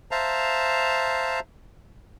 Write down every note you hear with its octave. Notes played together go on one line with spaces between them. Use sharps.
C5 E5 F5 A5 A#5